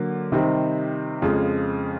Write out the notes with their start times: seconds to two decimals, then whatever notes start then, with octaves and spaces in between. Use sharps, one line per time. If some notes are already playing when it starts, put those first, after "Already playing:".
Already playing: D3 F#3 A#3
0.32 C3 D#3 G3 C4 D#4
1.22 F2 C#3 F3 G#3